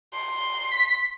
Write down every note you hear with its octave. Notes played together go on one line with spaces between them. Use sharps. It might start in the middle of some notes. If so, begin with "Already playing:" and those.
C6
B6